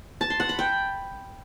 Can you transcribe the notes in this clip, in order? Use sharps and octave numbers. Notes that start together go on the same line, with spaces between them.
A5
C6
F#5
B5
G5